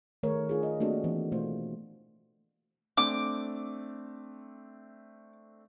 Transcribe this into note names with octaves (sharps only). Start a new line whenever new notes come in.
D#3 A3 G#4 A#4 C#5
D4 F4 G#4
F4 D#5
A3 A#3 C4 D4 F#4 A4
E3 B3
B2 A3 F4 C5
A3 C4 D4 D6